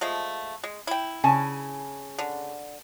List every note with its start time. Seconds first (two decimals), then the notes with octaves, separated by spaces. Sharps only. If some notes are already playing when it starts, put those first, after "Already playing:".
0.01 F3 G#3 A3
0.64 G#3
0.87 E4 G5
1.24 C#3 G#5 A5
2.19 D3